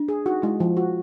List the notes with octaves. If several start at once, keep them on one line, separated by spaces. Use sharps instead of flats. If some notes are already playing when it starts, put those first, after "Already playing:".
Already playing: D4
G#4
D#4 F#4
G#3 E4
F3 F4
F4 F#4